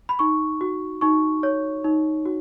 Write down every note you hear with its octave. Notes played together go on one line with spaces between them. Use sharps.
B5
D#4 C#6
F#4
D#4 C#6
C#5
D#4
F#4